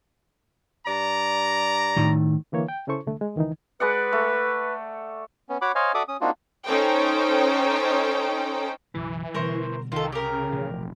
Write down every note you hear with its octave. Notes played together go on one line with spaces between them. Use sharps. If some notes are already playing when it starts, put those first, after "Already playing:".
G2 D5 A#5
A2 D#3
D3 E3 A#3 C#5
G5
C#3 C#4 E4 A4 C5 C#6
C2 D3 A3
G#3
C#2 D#3 E3 D#4
G#3 B4 D5 F#5
A3
B3 C#4
F#4 C#5 F#5 B5 D6
C5 C#5 D#5 F5 G#5
F#4 A4 D5 E5 D6 D#6
C#4 D#6
A#3 C4 D4 D#4 F4 F#4
C#4 D#4 A4 C5 G5
B1 F#2 C#3 E3
B2 D3 G3 A#4 C5 C#6
C2 D#3 F4 A4
C#3 G4 A#4
A1 B2 F3
F1